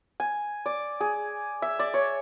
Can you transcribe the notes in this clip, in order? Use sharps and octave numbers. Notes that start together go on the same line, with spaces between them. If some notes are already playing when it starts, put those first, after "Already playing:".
G#5
D5
G#4
E5
D5
C#5